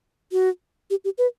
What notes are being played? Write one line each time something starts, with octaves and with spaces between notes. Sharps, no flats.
F#4
G4
G4
B4